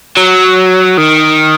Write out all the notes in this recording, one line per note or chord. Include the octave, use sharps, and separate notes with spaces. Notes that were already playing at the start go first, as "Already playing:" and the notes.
F#3
D#3